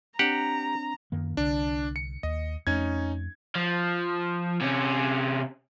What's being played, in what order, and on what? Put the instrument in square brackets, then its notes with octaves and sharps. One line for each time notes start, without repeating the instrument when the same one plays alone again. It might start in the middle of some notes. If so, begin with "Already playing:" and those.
[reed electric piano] C4 D4 [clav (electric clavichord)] G4 F#5 [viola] A#5
[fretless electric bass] F#2 D#3 A#3
[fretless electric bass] C2 D3 [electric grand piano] D4
[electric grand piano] C#7
[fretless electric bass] D#2 [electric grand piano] D#5
[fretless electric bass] F2 A3 [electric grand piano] C#4 D#4 G#6
[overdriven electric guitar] F3
C3 C#4